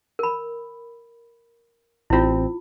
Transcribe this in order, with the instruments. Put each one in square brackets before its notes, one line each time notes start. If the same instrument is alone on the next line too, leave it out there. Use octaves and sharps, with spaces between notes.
[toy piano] A#4 B5
[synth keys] A1 C4 [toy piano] E4 F4